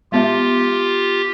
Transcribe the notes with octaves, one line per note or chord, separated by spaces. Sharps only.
G#3 B3 F4 G4 E5